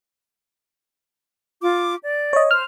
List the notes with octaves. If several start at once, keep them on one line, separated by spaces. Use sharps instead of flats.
F4 D6
D5
C#5 D#5
C5 F6